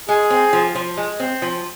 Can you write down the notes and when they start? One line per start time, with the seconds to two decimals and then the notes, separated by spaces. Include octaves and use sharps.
0.09 G#3 G#4
0.30 C4
0.53 F3
0.75 F3
0.97 G#3
1.20 C4
1.42 F3